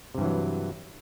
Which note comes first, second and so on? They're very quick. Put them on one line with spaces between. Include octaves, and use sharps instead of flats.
C3 G2 E3 F#3